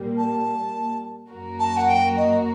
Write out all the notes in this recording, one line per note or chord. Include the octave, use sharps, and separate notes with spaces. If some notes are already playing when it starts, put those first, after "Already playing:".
Already playing: A#2 G3 A#3
A5
F#2 F#3 A#3 F#4 A#4
A5
F#5
G5
D#5